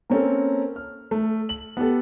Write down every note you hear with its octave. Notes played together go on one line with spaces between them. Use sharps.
A#3 C4 C#4 A4 A#4
F6
A3
F#7
B3 G4 A4